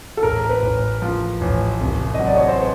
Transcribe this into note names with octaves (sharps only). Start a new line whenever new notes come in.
A4
A1 A#4
B4
A1
F3
A1
C2
F#3 D#5
D5
C#5
C5
B4